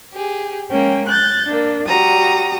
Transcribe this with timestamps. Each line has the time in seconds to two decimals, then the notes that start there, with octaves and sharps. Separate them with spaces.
0.13 G4 G#4
0.71 G#3 A#3 C#4 G5
1.09 F#6 G6 A6
1.47 A#3 D4
1.87 G3 F#4 A#5 D#6